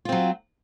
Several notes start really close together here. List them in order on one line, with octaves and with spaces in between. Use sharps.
F4 C4 F#3